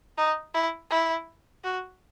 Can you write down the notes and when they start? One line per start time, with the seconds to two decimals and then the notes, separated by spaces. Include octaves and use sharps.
0.17 D#4
0.54 E4
0.90 E4
1.64 F#4